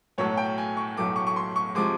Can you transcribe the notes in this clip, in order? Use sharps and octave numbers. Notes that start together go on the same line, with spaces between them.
B1 A2 F#3 A3 C#5
G5
G#5
C#6
B1 A2 F#3 A3 D6
C#6
C#6
C6
C#6
C3 F3 G#3 D6